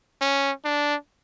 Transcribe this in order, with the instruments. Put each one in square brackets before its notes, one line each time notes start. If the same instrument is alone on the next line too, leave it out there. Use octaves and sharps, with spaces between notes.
[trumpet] C#4
D4